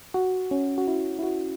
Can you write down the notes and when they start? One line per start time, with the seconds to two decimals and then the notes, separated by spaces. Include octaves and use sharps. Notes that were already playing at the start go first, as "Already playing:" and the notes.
0.14 F#4
0.51 C#4
0.78 F#4
0.88 E4
1.19 E4
1.23 F#4